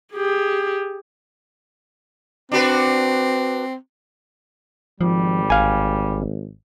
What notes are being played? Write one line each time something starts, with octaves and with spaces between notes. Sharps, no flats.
G4 G#4
C4 D4 F#4 B4
G#1 F3 G3
A1 F5 G#5